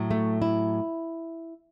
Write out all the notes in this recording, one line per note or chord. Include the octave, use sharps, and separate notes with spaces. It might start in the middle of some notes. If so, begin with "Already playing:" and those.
Already playing: A2 F#3
A3
E4